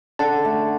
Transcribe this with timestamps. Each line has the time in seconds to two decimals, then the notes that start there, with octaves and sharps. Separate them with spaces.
0.19 D3 F#5 A5
0.45 A3